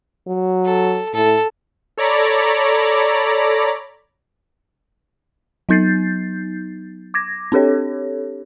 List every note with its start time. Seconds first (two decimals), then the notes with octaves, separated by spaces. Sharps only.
0.27 F#3
0.65 A4
1.14 A2 A4
1.97 A4 C#5 D5 A#5 B5 D6
5.69 F#3 B3 D#4 G6 A6 C7
7.14 D6 G#6 A#6
7.52 C4 D4 G4 A4 C#5